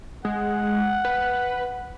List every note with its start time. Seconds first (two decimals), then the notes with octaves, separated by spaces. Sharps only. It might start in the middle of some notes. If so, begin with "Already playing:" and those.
0.25 G#3 F#5
1.05 B4